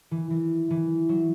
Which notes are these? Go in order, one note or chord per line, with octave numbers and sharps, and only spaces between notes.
E3
E3
E3
F#3